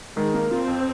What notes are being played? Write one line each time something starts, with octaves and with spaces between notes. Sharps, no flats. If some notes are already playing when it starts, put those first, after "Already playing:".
D#3 G#3
A#3
C4 F4
F2